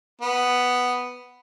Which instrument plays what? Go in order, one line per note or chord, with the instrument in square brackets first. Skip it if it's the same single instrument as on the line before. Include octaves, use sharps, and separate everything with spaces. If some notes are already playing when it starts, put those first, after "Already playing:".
[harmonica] B3